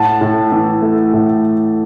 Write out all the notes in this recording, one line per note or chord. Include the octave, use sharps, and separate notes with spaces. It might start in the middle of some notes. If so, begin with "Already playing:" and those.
Already playing: A2 F#5 A5
A2
E3
A3
A2